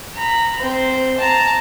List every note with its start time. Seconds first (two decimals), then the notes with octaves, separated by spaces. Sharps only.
0.16 A#5 B5
0.60 C4 C5
1.18 A5 A#5